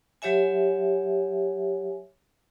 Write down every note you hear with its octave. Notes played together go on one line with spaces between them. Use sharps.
F#3 G4 C#5 E5 G#5